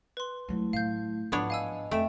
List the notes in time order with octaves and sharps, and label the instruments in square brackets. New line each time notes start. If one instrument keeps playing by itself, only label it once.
[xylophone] B4 C6
[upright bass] F#3 G#3 [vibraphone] A3 E4
[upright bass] A2 F#3 [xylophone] F5 G6
[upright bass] G#2 F3 [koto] B3 D4 C#5 [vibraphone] F#5
[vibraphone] D#5 [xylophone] F5 G#5 E6
[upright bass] F2 [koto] A3 [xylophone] G5 D7 E7